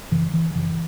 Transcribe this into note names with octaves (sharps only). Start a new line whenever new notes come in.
F#2 C#3 E3
E3
F#2 C#3 E3